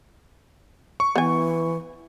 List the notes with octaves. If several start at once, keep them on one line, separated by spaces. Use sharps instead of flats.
C#6
E3 B3 G#5